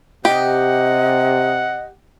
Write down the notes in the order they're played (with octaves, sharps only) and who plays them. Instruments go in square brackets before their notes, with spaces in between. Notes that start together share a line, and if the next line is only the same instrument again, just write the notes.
[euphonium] C3 [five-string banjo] G4 [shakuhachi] D#5 [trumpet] F#5